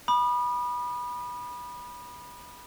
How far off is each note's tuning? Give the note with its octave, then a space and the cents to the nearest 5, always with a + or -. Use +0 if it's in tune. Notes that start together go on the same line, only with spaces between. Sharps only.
B5 -20 D#6 -40